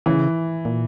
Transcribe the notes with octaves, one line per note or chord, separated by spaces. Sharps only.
C#3 E3
A#2